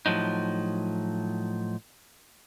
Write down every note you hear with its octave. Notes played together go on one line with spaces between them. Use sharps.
A2 F3 F#3 D#4